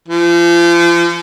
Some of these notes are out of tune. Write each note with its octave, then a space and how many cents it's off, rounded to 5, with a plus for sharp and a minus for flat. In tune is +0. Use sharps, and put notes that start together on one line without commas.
F3 -35